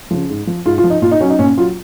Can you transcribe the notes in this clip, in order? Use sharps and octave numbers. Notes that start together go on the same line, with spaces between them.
C#3 F3
G#2
F3
G#2 F4
F4
F3
D#4
A#2 F4
D#4
F#3 C#4
D#4
A#2 C#4
F#3 F4